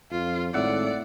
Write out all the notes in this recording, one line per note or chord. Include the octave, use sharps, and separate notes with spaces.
F2 F4
G#1 A2 D5 E5 F#5